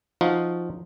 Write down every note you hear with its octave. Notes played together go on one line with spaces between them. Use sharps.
F3 D#4 F4 F#4